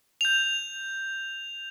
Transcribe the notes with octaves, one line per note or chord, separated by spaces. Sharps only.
G6 F7